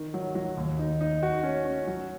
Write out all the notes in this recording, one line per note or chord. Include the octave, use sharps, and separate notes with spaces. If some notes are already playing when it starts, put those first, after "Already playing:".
Already playing: D#3
F#3
F#3
D#2
D#4
D#4
F#4
C#4
C#4
F#3